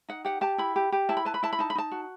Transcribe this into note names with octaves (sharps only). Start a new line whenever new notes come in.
D#4 F#5
G4 F#5
G4 A5
E4 B5
G4
G4
E4 A5
B5
B4 A5
B5
E4 A5
B5
D#4 A5
B5
D#4 A5
F#4